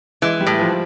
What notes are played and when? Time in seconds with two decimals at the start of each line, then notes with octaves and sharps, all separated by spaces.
0.22 E3 G#3
0.41 G3
0.46 A2
0.59 F3